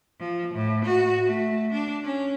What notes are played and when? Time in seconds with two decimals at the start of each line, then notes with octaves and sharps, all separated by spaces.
0.20 F3
0.54 A2
0.85 F#4
1.26 A3
1.71 D4
2.04 C#4